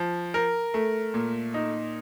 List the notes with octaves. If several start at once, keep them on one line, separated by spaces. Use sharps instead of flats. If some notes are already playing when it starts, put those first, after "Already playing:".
Already playing: F3
A#4
A3
A#2
D#4